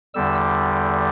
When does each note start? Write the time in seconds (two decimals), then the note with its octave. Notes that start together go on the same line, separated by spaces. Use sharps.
0.14 E2 D3 G3 E6